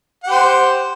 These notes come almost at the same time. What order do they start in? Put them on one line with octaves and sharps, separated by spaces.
F#5 G4 C5